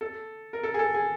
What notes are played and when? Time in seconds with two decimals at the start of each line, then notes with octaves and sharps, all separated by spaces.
0.01 A4
0.53 A#4
0.63 A4
0.74 G#4
0.79 A4
0.94 G#4